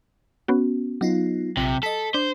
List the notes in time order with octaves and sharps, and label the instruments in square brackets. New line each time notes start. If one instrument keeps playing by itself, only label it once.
[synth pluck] B3 C#4 F#4
[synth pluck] F#3 [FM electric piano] B3 D#4 F4
[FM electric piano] A#1 B6 [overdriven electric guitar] C3
[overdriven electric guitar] A4 [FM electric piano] D#5 B6
[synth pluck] D4 [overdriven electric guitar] C5